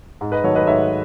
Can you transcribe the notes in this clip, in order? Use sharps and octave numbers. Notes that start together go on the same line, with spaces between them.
G#2
B4 D#5
D#3 F#3 A3 A4 C#5
B4 D#5
G#2 C#5 E5